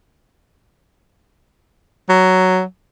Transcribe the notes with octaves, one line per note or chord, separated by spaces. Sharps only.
F#3